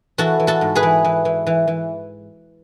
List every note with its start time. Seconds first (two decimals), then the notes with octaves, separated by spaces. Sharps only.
0.18 E3 F#4 A4
0.40 E3
0.47 F#4 A4
0.61 G#2
0.75 G#4 B4
0.83 E3
1.05 E3
1.25 E3
1.47 E3
1.68 E3